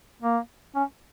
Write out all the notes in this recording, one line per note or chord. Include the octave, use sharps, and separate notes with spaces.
A#3
C#4